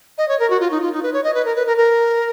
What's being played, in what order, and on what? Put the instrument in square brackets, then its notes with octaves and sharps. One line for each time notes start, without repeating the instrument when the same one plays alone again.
[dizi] D#5
C#5
A#4
F#4
F4
D#4
F4
D#4
B4
C#5
D#5
B4
A#4
B4
A#4
A#4